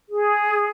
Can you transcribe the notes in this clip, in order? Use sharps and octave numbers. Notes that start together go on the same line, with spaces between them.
G#4